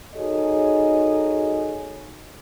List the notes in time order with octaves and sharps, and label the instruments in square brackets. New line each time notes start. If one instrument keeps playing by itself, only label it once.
[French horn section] D#4 F#4 G#4 A4 C#5 D#5